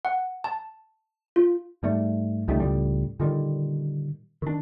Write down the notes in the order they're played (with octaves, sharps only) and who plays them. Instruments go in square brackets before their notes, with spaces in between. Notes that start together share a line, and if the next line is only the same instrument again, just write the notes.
[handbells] F#5
A5
F4
[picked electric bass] G#2 G3 A3
C#2 D#3 G3 A3
C#2 A2 G3
A#2 D3 D#3 G3
D#3 D4